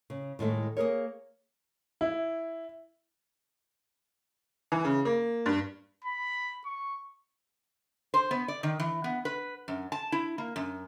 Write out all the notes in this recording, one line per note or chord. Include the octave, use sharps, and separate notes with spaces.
C#3
A2 D#3 G#3 A3
A#3 G#4 A#4 C#5
E4
E3
C#3
A#3
G2
B5
C#6
C5
B3
D5
D#3
E3
B3
B4
F#2
A5
E4
A#3
F#2